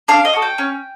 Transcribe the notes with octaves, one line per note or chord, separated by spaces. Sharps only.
D4 F5
D#5
F#4 A4
G5
C#4